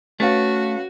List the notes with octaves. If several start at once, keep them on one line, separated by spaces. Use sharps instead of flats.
A3 C#4 F#4 B4 F5